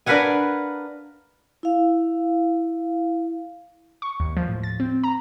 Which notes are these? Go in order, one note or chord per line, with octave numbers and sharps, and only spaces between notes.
D4 A#4 B4 F5 F#5 G#5
E4 F5
C#6
D#2
F3
A2
A6
C4
A#5